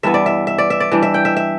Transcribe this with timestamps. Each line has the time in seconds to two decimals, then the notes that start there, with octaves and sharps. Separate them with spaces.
0.03 G2 E3 B3 E5
0.14 D5
0.26 E5
0.47 E5
0.58 D5
0.70 E5
0.80 D5
0.92 E3 G3 D4
1.03 E5
1.14 G5
1.25 E5
1.37 E5